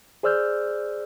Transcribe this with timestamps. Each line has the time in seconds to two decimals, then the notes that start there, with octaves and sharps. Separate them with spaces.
0.23 G#4 C5 D5 E6 F6 G6